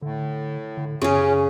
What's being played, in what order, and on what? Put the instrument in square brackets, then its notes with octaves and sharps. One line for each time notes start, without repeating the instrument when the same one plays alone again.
[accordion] A2 [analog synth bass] D3
[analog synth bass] D3
[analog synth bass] F#2 [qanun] C#3 G#4 [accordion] C#4